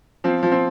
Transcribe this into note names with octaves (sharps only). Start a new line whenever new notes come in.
F3 C4
F3
C4